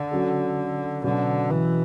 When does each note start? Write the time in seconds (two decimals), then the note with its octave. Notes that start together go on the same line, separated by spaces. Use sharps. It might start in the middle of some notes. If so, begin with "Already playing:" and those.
Already playing: D3
0.11 F#3 C#4 F#4 A4
1.04 B2 D3 F#3 C#4
1.50 E3